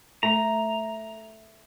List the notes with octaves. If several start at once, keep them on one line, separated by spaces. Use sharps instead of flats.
A3 A#5